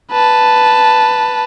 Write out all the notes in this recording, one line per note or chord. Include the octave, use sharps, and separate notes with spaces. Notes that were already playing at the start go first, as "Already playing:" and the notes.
B4 A5